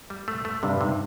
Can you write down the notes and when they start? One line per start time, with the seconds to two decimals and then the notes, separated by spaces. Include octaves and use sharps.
0.10 G3
0.28 A3
0.45 A3
0.63 G2 C3
0.75 G#2
0.81 C3